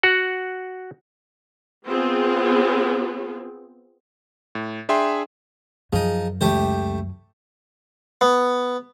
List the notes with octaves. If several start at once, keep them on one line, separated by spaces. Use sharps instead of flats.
F#4 F#5
B3 C4 F4 G#4
A2
D4 G#4 E5 G5 C6
F#2 F3 D#4 G#4
C#2 A3 G4 C5
B3